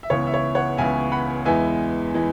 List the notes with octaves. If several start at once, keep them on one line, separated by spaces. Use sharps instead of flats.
E5
C#2 C#3 E3 B3 C#5
E5
C#5
C#5 F#5
C#2 C#3 E3 B3 E5 G#5
F#5 B5
E2 E3 G#3 B3 E5 G#5
E3 G#3